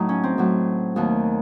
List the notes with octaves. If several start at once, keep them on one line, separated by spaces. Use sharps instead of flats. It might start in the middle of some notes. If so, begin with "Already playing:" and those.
Already playing: A2 F#3 A3 D#4
C#4
C4
A2 F#3 A3
D#2 D#3 F#3 A3